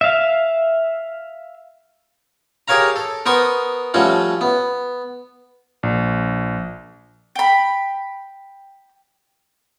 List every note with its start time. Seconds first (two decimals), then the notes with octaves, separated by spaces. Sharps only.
0.01 E5 F5
2.68 G4 G#4 A#4 C#5 F5 A#5
2.96 A4
3.26 B3 A#4 C5 C#6 D#6
3.94 F3 G3 A3 C#4 F#4
4.41 B3
5.83 A#1
7.36 G5 B5